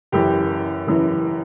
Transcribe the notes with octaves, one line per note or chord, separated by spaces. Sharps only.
F#1 F#2 E3 G4
F#1 F#2 E3